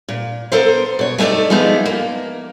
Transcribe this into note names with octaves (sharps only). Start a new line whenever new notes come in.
A#2
B3 A4 A#4 C5
B2 C#5
A3 B3 D#4 A4 D5
F3 G#3 A3 B3 D#4
A#3